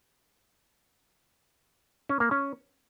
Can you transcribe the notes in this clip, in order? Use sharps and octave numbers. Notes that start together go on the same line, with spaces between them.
C#4
A#3
C#4